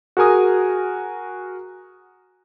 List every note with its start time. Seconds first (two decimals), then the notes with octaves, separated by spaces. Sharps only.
0.17 F#4 G#4 A#4 G#5 D#6